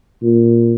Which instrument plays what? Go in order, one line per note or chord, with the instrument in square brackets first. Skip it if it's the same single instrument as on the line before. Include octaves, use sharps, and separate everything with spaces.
[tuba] A#2